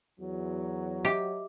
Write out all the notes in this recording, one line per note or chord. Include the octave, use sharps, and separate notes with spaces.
E2 F#3
G4 D#5 E5 D6